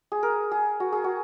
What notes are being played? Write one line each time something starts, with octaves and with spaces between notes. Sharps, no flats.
G#4
A#4
G#4
F#4
G#4
F#4